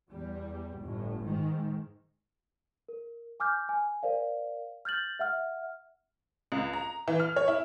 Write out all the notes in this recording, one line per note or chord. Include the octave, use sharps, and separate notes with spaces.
E2 G3
G1 A2
G#2 D#3
A#4
G#5 D6 F6 G6
G#5
A#4 C5 D5 F5
F6 G6 A6 F#7
E5 F#5 F6
C#2
A#5
E3
F6
C#5
E4